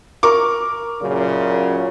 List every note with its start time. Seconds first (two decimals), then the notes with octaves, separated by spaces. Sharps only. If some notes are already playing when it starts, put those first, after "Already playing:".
0.23 A#4 C#6 D6
1.01 F#2 A#2 C#3